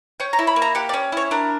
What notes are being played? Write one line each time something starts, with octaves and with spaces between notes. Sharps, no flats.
C#4 G5
A#5
E4
B5
A#3
A#5
G4 F#5
D5
C#4
E4 C#5
D4 A#4